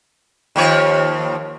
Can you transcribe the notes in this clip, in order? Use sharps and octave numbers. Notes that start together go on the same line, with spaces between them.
D#2 F3 C#5